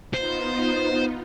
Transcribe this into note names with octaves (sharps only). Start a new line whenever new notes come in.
B3 D#4 F4 C5